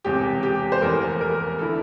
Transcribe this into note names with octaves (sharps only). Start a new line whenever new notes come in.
E1 E2 C3 G4
G4
C5
F1 E2 E3 A3 A#4
A#4
D3 A3 E4 A4